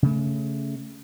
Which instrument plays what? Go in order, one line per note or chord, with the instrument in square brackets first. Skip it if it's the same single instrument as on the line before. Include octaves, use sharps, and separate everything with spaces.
[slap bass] C#3 A3